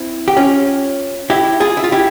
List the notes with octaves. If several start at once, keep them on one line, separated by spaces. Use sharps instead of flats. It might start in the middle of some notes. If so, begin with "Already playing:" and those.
Already playing: C4 E4
G4
C#4 F4
E4 G4
F4 G#4
E4
F4
E4 G4